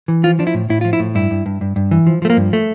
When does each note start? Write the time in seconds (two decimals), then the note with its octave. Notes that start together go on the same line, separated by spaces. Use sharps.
0.08 E3
0.23 F3 F4
0.39 F3 D4
0.47 E4
0.54 A2
0.70 A2 E4
0.81 F3 F4
0.93 E4
1.00 A2
1.15 G2 E4
1.31 G2
1.46 G2
1.61 G2
1.76 G2
1.91 E3
2.07 F3
2.22 F3 A3
2.30 A#3
2.37 G2
2.53 A3